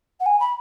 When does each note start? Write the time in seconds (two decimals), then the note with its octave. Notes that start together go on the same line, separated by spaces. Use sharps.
0.20 F#5
0.25 G#5
0.39 B5